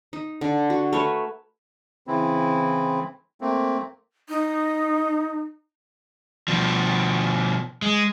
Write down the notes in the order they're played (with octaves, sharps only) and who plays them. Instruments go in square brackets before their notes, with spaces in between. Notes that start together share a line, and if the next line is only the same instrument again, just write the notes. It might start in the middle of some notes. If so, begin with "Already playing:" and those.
[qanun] D#4
D3
F#4
A3 A#4 B4 C#5
[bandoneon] C#3 E3 C4 E4
A3 A#3 C4
[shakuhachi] D#4
[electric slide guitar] B2 F3
G#3